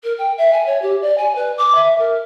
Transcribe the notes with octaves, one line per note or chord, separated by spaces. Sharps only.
A#4
G5
E5
G#5
C#5
G4
D5
G#5
B4
D6
E5
A#4